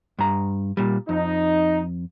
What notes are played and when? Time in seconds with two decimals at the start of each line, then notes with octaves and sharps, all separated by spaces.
0.19 G2 A#5
0.77 A#2 G3
1.09 F2 D#4